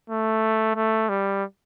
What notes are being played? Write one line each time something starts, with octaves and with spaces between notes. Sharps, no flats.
A3
A3
G3